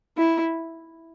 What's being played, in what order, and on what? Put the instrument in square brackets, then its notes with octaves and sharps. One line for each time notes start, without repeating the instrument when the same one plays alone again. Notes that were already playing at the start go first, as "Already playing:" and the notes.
[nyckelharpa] E4